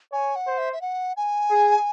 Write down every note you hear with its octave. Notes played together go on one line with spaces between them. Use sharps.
C#5 G#5
F#5
C5
E5
E5
F#5
G#5
G#4